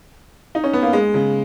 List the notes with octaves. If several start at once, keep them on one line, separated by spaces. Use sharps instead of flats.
D#4
C#4
B3
A#3
G#3
C#3